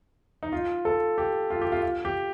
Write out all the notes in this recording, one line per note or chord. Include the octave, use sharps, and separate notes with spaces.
D#4
F4
A4
G4
F4
G4
F4
F4
G4